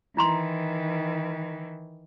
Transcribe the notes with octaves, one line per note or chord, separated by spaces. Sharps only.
D#3 E3 E4 A#5 C6